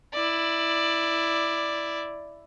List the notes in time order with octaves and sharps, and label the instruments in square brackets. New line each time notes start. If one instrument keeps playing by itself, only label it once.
[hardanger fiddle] E4 D5